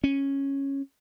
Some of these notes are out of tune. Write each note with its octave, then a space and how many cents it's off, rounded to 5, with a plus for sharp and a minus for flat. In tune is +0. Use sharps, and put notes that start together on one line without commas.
C#4 -10